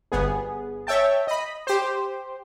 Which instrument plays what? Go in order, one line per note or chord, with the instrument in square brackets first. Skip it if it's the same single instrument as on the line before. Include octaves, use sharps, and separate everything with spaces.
[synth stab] G1 B3 G#4
C#5 E5 G5 A5
D#5 B5
G4 C5